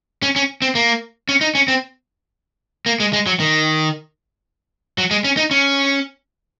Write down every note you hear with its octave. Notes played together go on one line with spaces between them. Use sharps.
C#4
C#4
C4
A#3
C#4
D#4
C#4
C4
A#3
G#3
G#3
F#3
D#3
F#3
G#3
C#4
D#4
C#4